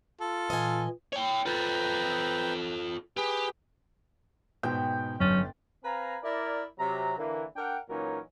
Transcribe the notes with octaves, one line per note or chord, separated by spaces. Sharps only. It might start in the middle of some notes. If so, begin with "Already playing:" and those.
F4 A4
A#2 E3 D#5 G#5
C#5 G5
F4 A4 B4 G5 A#5
G4 G#4 B4
G#2 B2 G5
G1 F#3 C#4 A6
C4 B4 F5 G#5 A#5
E4 A#4 D5
C3 F#3 A#5
D3 E3 A#3
D4 A#4 F#5 G5
A#2 E3 F#3 C#4 D#4 A#4